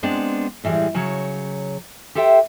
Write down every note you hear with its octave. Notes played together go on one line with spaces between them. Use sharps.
G#3 B3 C4 D4
A2 E3 F3 G3 G#3
C#3 F#3 C#5
G4 A4 C5 E5 G5